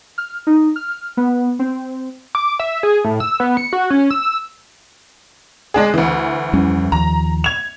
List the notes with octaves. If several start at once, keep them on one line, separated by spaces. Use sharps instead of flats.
F6
D#4
F6
B3
C4
D6
E5
G#4
A2
E6
B3
C#7
F#4
C#4
E6
G#3 D4 G#4
D2 E3
F2 G3 C#4
D#2 F3 A#5
G#6 F7